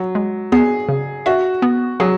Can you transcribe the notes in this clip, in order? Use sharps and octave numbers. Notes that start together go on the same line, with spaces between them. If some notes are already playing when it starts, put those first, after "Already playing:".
Already playing: F#3
G#3
B3 G#4
C#3
F#4 E5
B3
F#3 G#4